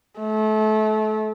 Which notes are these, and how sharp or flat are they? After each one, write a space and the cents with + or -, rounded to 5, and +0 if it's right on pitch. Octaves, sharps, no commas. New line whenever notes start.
A3 -30